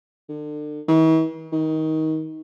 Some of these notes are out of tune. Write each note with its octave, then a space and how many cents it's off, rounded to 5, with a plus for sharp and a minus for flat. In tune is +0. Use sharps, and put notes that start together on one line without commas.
D3 +35
E3 -45
D#3 +20